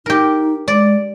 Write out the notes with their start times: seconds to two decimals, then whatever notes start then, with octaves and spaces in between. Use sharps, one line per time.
0.06 D#4 G4 A#4
0.68 G#3 D5